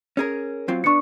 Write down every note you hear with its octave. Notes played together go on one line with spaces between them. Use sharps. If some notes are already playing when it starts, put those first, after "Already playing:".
C#4 G#4 A#4
F#3 C4 F4
B3 D4 C#6 C#7